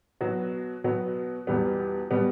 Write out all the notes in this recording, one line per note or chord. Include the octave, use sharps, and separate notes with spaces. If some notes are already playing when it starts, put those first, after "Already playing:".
B2 F#3 B3 F#4
B2 F#3 B3 F#4
E2 B2 G3 B3
B2 G3 B3